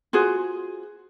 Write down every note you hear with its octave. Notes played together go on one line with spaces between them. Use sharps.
F4 F#4 G#4 C5